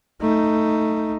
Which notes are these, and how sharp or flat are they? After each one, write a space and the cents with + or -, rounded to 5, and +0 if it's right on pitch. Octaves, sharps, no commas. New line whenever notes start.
A3 +10 D#4 +0